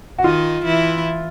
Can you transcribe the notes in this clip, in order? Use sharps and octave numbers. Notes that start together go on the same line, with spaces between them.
F#4
D#3 D#4 F4
E3 E4